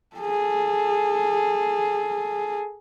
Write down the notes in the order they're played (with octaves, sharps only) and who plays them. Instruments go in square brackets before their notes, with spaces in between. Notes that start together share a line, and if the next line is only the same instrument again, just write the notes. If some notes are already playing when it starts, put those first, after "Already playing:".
[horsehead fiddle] G#4 A4